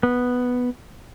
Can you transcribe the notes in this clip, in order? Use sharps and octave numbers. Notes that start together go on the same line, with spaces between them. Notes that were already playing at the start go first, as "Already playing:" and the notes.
B3